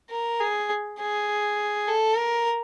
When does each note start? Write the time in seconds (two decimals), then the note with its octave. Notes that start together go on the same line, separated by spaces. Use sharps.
0.11 A#4
0.40 G#4
1.00 G#4
1.88 A4
2.17 A#4